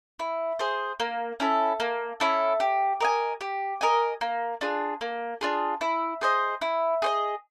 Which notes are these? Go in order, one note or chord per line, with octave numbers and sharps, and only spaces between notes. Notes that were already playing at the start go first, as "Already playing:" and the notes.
E4
G#4 C5
A#3
C#4 E4 A4
A#3
C#4 E4 A4
G4
A#4 D#5 G#5
G4
A#4 D#5 G#5
A#3
D4 F4 G#4
A#3
D4 F4 G#4
E4
G#4 C5 D#5
E4
G#4 C5 D#5